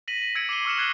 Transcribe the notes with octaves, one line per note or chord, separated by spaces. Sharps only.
A#6 B6 D#7 F#7
A#6
E6 G#6 C#7 D7 F#7
D6 C7 D#7 G7
C#6 E6 F6 C#7 E7
D6 F#6 G#6 C7 G7